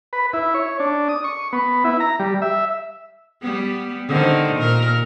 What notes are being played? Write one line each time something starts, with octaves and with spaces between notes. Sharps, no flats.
B4
E4
C#5
D4
D#6
C#6
B3
E4
A#5
G3
E5
G3 B3
D3 D#3 C5
A#2 A#4